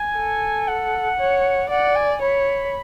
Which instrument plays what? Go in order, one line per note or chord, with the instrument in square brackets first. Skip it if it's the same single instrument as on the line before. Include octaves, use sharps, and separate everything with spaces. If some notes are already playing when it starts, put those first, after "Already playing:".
Already playing: [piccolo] G#5
[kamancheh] A4
[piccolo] F#5
[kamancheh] C#5
[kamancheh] D5 [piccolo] F#5
[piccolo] G#5
[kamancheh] C#5 [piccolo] B5